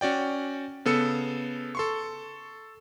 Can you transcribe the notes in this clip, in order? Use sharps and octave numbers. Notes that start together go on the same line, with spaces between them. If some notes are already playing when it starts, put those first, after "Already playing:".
C#4 F#4 D5 G5
C#3 B3 A4 E6 C#7
A4 C6 C#6